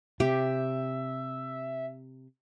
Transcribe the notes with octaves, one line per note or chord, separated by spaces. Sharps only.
C3 G4 E5